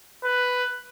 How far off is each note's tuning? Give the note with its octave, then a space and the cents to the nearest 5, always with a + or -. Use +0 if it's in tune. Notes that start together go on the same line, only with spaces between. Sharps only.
B4 +5